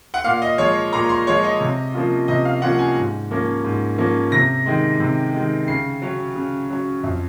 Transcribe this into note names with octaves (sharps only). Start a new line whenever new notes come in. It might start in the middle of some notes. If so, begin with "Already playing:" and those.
F#5
A#2 F5
D#5
F3 G#3 C#5
A#2 A#5
C6
F3 G#3 C#5
D#5
C3
F3 A#3 C#4 F4
C3 D#5
F5
F3 A#3 C#4 F4 F#5
G#5
G#2
F3 A#3 C#4
G#2
F3 A#3 C#4
C3 A#6
D#3 G#3
C3
D#3 G#3
C#3 C7
F#3 C#4
C#3
F#3 C#4
F2